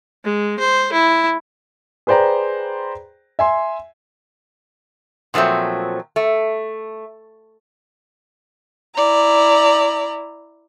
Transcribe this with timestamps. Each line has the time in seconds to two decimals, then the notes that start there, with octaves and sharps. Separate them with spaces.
0.24 G#3
0.59 C5
0.92 E4
2.07 G#4 B4 C5 D5 G5 A#5
3.39 E5 G#5 C6
5.34 A#2 F3 F#3 A3 C4
6.16 A3
8.95 E4 D5 A#5